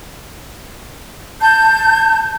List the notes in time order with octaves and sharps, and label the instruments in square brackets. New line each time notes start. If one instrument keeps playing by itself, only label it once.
[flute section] A5 G6